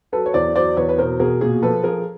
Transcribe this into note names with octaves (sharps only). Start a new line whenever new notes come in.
F#3 A4 B4
C#5
E2 C5 D5
F#3 C5 D5
E2 B4 C#5
B4
B2 A#4 C5
B2 G#4 A#4
A#2 G#4
F3 A4 B4
F3 G#4 A#4